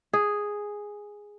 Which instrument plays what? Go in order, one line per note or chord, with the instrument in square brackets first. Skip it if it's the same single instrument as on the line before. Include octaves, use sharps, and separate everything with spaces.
[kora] G#4